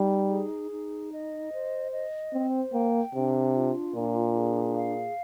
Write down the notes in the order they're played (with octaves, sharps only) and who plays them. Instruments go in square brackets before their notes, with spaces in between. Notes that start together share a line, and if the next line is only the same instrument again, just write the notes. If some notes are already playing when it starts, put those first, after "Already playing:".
Already playing: [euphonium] G3 [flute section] D#4
[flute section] G#4
D#4
D#5
C5
D#5
[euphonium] C4 [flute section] C5
[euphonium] A#3 [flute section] G5
[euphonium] C3 [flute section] D4
[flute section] F4
[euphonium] A#2 [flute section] D4
[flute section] G#4
F5